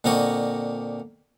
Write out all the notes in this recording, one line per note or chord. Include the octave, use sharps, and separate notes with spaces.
A#2 D3 A#3 C4 D#5 C#6